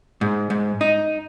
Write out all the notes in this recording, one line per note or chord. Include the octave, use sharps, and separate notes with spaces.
G#2
G#2
D#4